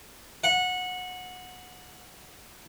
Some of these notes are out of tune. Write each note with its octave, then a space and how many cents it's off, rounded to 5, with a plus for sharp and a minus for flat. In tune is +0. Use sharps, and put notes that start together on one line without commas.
F#5 -20